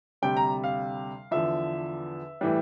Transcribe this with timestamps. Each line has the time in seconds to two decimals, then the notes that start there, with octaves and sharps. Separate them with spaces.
0.22 D2 C3 G3 G5
0.37 A#5
0.64 F5
1.31 E2 D3 F3 E5
2.41 A2 E3 G3